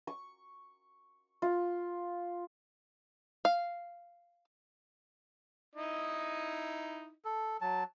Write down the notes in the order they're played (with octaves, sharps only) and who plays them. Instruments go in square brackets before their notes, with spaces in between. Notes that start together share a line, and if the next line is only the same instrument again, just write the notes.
[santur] C#6
F4
[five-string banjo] F5
[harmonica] D#4 E4 D#5
[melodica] A4
F#3 A5